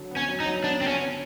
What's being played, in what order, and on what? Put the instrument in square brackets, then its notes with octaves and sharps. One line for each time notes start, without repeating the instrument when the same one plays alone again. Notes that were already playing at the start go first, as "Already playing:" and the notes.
Already playing: [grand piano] D3 F#3
B3
[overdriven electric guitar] C#4
[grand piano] F#3
[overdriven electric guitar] D#4
[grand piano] F#3
[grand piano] B3 [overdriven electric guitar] D4
[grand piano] D3 [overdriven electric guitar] C4
[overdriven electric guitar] C#4
[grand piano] B3